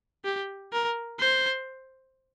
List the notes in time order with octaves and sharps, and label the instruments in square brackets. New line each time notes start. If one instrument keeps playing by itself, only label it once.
[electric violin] G4
A#4
C5